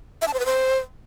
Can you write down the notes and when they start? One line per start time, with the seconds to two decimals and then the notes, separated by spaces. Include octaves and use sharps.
0.22 E5
0.28 A5
0.34 C5
0.40 B4
0.45 C5